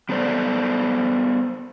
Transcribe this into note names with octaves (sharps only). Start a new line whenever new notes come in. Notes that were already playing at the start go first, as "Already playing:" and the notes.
G3 B3 A4 C5 D5